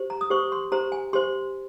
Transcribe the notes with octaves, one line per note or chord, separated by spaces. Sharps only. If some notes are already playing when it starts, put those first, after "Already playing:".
Already playing: G4 C5
A#5
D#6
G4 C5 C#6
C6
G4 C5 A#5
G#5
G4 C5 C6